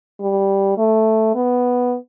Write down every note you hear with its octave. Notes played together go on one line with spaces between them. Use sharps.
G3
A3
B3